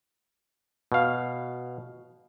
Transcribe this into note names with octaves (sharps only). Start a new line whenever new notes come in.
B2 F5